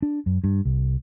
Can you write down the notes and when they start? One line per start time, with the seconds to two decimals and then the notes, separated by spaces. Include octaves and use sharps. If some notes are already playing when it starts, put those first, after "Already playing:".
0.02 D4
0.26 F#2
0.44 G2
0.65 C2